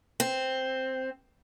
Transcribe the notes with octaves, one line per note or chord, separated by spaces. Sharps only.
C4